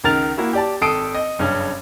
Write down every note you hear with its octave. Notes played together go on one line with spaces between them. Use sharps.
C#2 D#3 A#4 A6 F7
A#3 E4 F#4
G4 D5 A5
G#1 A4 D#6 C7 D7
D#5
F#1 G2 C#3 C#4